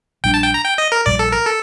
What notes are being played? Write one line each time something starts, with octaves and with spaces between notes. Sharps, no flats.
A#1 A#2 G3 D4 G5
A5
G5
A#5
G5
D#5
A#4
A#1 A#2 G3 D5
A4
A#4
A4